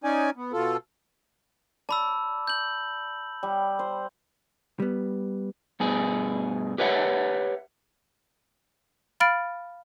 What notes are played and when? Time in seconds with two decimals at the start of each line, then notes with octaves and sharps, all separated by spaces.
0.04 C#4 D#4 D5 G#5
0.36 B3
0.53 B2 F4 A4
1.89 D5 A5 B5 E6
2.47 G6 F#7
3.43 G3
3.79 C5
4.80 G3 B3
5.80 G2 B2 G#4
6.78 G4 B4 C#5 E5 F#5
9.20 F5 B5 F6 A6 D7